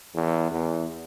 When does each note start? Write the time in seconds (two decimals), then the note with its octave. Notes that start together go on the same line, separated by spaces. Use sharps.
0.14 E2
0.51 E2